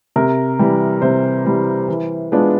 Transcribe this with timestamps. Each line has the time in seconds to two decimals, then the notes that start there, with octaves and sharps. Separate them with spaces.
0.16 C3 A#4
0.59 E3 G3
1.02 C3 C5
1.45 E3 G3
1.88 E3
2.32 G#3 B3 D4 F4